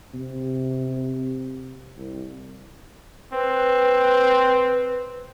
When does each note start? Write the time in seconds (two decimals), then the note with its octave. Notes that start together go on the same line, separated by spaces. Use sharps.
0.14 C3
1.98 C2
3.33 C4 B4